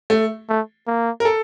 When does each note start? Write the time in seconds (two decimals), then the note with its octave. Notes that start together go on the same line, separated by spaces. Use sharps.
0.10 A3
0.49 A3
0.87 A#3
1.20 A#4
1.25 A4